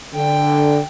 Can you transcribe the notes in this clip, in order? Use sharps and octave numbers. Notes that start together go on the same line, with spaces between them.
D3 G5